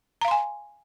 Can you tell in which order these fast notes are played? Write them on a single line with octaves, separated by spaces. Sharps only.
A#5 F5 C6 G#5